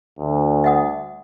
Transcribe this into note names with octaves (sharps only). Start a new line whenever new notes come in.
D2
E5 F#5 D#6